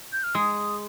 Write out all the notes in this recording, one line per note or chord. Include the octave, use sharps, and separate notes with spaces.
G6
F6
G#3 D#6